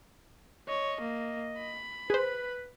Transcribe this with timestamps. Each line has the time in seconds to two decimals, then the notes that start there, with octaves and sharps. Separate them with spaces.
0.68 C#5 D#5
1.01 A#3
1.58 B5
2.10 G#4 B4 C5